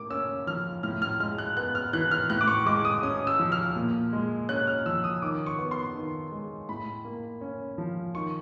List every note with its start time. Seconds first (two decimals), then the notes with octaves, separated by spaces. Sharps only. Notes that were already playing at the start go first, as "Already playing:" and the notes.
Already playing: A2 A#3 D6
0.10 C#4 E6
0.47 F3 F6
0.83 A2 F6
1.02 F6
1.20 G#3 F6
1.38 F#6
1.57 B3 F#6
1.75 F6
1.93 E3 F#6
2.11 F6
2.30 A2 F#6
2.41 D6
2.48 C#6
2.66 G#3 D6
2.85 D#6
3.03 C#4 D#6
3.27 E6
3.39 F3
3.52 F6
3.76 A#2
4.13 G#3
4.49 C#4 F#6
4.67 F6
4.86 F3 E6
5.04 D#6
5.22 D#3 D6
5.46 C#6
5.59 B3
5.71 C6
5.95 D#3
6.32 G#3
6.69 A2 B5
7.05 A#3
7.41 C#4
7.78 F3
8.15 D#3 C#6